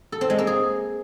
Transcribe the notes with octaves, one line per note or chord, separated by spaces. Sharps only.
A4
C4
G#3
A#3
G#4